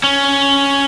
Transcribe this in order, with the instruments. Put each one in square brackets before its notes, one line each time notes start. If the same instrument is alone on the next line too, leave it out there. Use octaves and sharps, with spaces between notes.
[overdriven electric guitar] C#4